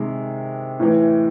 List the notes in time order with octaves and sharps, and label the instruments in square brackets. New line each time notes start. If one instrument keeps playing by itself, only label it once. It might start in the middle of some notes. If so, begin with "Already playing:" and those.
Already playing: [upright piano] C3 D#3 G#3
A2 E3